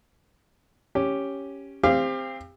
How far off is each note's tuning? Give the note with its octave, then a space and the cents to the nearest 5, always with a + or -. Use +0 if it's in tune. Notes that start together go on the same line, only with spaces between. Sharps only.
C#4 +0 G4 +0
C4 +0 G4 +30 F5 -15